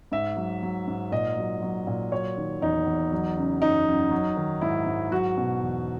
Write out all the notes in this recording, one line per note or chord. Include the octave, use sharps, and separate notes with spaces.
G#2 E5
F#3
F#3
G#2
A#2 D#5
F#3
F#3
A#2
F#3 C#5
D#3
E2 D#4
E2
F#3
C#3
F#2 D#4
F#2
F#3
D#3
G#2 E4
G#2
F#3 F#4
B2
E2